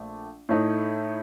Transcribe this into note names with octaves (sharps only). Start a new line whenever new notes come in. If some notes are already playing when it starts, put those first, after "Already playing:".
Already playing: A#1 A3
A2 A3 D#4